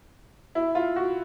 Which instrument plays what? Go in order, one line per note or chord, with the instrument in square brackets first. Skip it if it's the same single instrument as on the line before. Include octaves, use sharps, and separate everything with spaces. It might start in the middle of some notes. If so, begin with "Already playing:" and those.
[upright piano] E4
F4
F#4